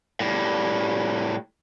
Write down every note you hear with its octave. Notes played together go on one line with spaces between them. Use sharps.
A2 G3